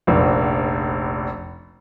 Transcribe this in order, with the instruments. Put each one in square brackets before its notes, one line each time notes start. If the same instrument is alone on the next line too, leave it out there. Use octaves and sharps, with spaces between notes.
[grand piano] F1 A#1